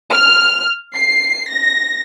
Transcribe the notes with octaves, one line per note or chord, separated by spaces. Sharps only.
F6
C7
A#6